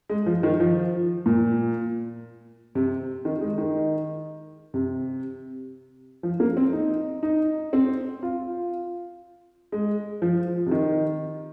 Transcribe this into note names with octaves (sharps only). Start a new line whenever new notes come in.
G#3
F3
D#3
F3
A#2
C3
D#3
G#3
D#3
C3
F3
A#3
C4
D#4
D#4
C4
F4
G#3
F3
C3
D#3